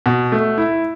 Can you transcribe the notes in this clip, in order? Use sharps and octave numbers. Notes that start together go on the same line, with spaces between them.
B2
A3
E4